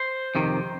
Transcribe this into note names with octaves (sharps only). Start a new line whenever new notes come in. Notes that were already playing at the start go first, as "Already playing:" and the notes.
Already playing: C5
F2 C3 D#3